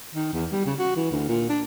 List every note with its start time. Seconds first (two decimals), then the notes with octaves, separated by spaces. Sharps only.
0.15 D#3
0.33 E2
0.52 G3
0.66 C#3
0.79 F#4
0.96 E3
1.11 D2
1.28 A#2
1.49 D4